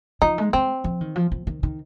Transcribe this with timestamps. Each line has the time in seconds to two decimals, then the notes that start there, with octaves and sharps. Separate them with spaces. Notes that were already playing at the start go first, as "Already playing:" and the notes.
0.22 F3 D#4
0.38 G#3
0.53 G#3 C4
0.84 F3
1.01 D#3
1.16 F3
1.32 F3
1.47 D#3
1.63 D#3